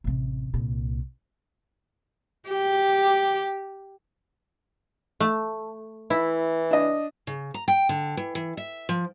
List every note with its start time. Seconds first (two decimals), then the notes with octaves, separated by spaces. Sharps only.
0.04 A1 C3
0.54 C2 A#2
2.50 G4
5.20 A3
6.10 E3 E4
6.71 D4 D#5
7.27 C#3
7.54 A#5
7.68 G5
7.89 D3
8.17 E3
8.35 E3
8.57 E5
8.89 F3